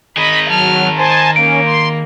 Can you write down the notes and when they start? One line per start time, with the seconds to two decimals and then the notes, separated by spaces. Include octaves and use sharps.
0.17 D#3 G#4 D#5 B5
0.48 F#3 A5 F6
0.97 C5 D#5 G#5 A5
1.36 A#3 C#4 D7
1.65 C6